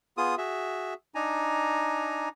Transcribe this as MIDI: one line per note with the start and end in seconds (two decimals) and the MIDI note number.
0.17 0.35 59
0.17 0.35 65
0.17 0.35 68
0.17 0.35 87
0.38 0.94 66
0.38 0.94 68
0.38 0.94 76
1.15 2.29 62
1.15 2.29 63
1.15 2.29 80
1.15 2.29 82